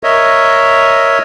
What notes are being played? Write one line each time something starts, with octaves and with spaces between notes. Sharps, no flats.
A#4 C#5 D#5 E5